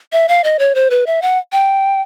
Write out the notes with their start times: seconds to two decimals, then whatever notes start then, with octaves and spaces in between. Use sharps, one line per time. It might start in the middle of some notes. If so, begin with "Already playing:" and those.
0.12 E5
0.28 F5
0.44 D#5
0.59 C#5
0.75 C5
0.90 B4
1.06 E5
1.22 F#5
1.52 G5